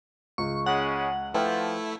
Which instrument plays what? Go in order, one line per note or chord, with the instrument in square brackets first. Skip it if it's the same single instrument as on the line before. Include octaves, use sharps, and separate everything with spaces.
[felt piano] C#2 [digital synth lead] C#6
[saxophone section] C#3 G#3 C#4 [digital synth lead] F#5
[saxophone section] F3 [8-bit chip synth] A3 E4 [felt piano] B4 G5